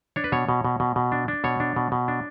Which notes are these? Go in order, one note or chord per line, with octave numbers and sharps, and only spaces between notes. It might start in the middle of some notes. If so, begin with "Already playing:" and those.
D4 C#5
B4
B2 C#5
B2
B2
B2
B2
D4
D4
B2 C#5
D4
B2
B2
D4